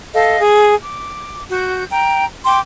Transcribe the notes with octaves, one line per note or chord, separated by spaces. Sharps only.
A4 D#5 F5
G#4
D6
F#4 G6
G5 A#5
G5 C6 D6